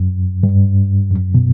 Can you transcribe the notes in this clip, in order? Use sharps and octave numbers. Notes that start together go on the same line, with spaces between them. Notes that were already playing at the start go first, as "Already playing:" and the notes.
Already playing: F#2
G2
F#2
B2